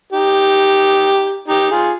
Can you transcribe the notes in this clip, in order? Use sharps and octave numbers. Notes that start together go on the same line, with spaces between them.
D#4 G4
D#4 G4
F4 G#4